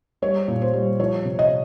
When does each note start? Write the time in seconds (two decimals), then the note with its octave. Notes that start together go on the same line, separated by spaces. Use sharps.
0.22 G3 C#5
0.48 A#2
0.61 C5
0.74 G3
0.99 F3 C#5
1.25 C3
1.39 D#5